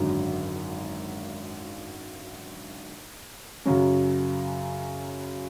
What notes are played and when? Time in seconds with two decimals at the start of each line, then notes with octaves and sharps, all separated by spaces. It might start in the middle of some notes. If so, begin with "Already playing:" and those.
Already playing: G#1 F#2 D3
3.65 F#2 C#3 F#3 C#4 F#4